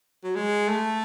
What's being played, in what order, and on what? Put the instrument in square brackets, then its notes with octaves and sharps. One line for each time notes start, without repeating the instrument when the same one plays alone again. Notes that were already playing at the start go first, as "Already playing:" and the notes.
[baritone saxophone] F#3
G#3
A3